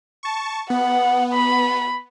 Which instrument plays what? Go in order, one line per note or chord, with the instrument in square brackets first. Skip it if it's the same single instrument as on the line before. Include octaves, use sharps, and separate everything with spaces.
[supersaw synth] A5 C#6
[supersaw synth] B3 [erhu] F#5
[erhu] B5